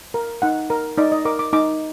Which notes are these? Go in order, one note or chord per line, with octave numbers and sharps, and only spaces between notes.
A#4
D#4 F#5
A#4
D#4 D5
D#5
A#4 D6
D6
D#4 D6